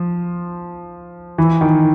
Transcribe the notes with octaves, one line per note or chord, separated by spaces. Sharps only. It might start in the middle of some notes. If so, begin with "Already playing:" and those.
Already playing: F3
E3
D#3